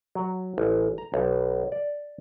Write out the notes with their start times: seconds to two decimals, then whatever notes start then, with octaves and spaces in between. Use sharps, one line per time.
0.15 F#3
0.58 A1
0.98 A#5
1.14 B1
1.72 D5